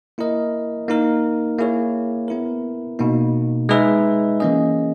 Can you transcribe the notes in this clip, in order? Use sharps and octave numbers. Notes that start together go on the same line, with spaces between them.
A#3 E4 A#4 D#5
A#3 D#4 A#4
A#3 E4 G#4 C#5
B3 E4 A#4
B2 A#3 D#4
G#3 D#4 G#4 B4 E5
E3 A#3 C#4 G#4 D#5